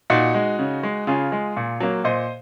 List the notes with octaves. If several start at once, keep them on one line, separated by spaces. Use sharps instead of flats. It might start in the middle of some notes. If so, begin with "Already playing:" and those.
A#2 D#4 F#4
G#3
C#3
G#3
C#3 F4 G#4
G#3
A#2
F#3 A#3
A#2 C5 D#5